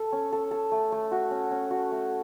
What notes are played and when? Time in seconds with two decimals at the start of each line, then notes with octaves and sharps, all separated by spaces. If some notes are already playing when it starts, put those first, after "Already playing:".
Already playing: A4
0.12 C#4
0.32 A4
0.51 A4
0.72 A3
0.92 A3
1.11 F#4
1.31 C#4
1.51 C#4
1.71 F#4
1.92 A3